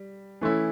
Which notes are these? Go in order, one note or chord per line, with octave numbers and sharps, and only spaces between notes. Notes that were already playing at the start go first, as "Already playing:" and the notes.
Already playing: G3
E3 A3 C#4 E4